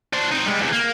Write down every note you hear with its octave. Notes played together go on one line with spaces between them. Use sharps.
D4 C5
C4 D#4
G3 G#3
E2 C3
A#3